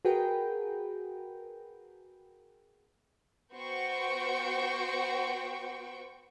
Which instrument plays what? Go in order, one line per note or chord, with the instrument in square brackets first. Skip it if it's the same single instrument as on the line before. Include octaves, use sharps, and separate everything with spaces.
[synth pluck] F#4 G#4 A#4 B4 G5
[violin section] B3 F#4 C5 G5 C#6